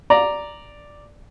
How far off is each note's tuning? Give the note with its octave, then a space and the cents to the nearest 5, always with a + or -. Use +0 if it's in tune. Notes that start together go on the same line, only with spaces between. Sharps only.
D5 +0 A#5 +0